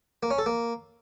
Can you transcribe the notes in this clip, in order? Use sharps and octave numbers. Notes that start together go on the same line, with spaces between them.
A#3
C#4
A4
A#3